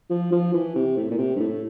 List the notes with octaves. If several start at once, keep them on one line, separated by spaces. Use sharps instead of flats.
F3
F3
E3
C3
A2
A#2
C3
G2
A2